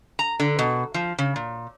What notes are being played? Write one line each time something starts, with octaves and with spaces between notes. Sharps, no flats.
A#5
D3
B2
F3
C#3
A#2